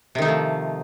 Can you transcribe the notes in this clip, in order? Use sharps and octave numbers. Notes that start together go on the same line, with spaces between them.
C3 D#3 F3 A3 D#4